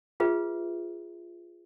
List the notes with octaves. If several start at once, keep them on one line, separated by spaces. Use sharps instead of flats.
F4 G#4 B4 E5